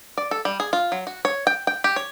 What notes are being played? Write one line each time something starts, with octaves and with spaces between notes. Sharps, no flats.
D5
A4
G3
G#4
F4
F#3
F#4
C#5
G5
G5
G4
C#5